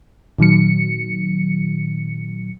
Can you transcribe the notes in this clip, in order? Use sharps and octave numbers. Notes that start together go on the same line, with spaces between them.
A#2 D#3 F#3 C#7